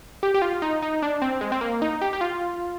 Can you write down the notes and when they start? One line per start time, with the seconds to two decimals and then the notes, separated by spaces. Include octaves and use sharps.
0.23 G4
0.34 G4
0.42 F4
0.62 D#4
0.82 D#4
1.02 D4
1.22 C4
1.41 G#3
1.52 C4
1.61 A#3
1.82 D#4
2.02 G4
2.13 G4
2.21 F4